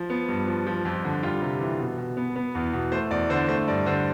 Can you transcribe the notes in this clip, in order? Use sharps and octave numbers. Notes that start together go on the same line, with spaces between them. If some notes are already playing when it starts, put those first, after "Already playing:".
Already playing: F3
B3
G2
F3
F3
F2
D3
G3 F4
C3
E3
B2
B2
B3
B3
E2
B2
A3 C5
E2 D5
D3 C5
A3 C5
G2 D5
D3 C5